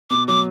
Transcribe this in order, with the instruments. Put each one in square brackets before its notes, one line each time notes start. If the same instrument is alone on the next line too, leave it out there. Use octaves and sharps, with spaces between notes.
[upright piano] B2 [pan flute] D6
[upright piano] F#3 [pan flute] D6